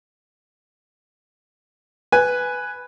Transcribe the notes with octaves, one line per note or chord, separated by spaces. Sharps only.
B4 G#5